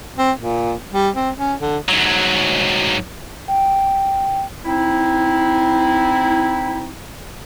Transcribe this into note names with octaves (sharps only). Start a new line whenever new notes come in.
C4
A#2
G3
C4
C#4
D3
G#2 F#3
G5
C4 D#4 E4